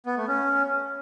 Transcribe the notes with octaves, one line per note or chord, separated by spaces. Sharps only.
B3
A3
C#4